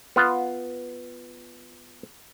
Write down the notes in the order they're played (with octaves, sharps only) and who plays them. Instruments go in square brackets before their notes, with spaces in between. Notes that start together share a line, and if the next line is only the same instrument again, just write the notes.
[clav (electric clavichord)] B3 F4